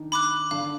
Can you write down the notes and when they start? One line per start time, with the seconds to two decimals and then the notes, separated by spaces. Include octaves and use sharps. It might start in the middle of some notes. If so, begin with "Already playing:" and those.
Already playing: D#3 D4 D#4
0.12 B5 D6 F#6
0.51 D3 D4 F5